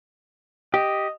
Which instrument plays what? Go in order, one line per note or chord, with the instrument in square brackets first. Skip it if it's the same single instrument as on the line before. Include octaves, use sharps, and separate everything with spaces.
[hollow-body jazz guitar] G4 [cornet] D#5